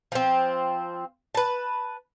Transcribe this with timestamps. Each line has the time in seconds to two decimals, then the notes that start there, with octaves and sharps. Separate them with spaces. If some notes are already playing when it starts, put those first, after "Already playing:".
0.12 F3 C4
1.35 B4 A5